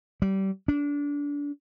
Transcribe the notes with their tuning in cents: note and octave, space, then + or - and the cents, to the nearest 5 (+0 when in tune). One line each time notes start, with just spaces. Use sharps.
G3 -25
D4 -25